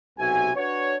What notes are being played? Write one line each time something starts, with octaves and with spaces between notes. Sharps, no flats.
B1 C3 F#4 E5 G#5
D4 F#4 B4 C#5